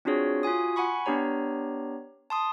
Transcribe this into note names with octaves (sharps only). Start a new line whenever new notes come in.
C4 D4 F4 F#4 G#4 C#5
F4 F#4 G#5 D#6
F#5 G#5 B5 C#6
B3 D4 G4 C#5 A#5
A5 C6 D#6